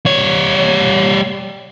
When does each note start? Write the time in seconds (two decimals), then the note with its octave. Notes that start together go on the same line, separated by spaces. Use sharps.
0.06 G3 C#5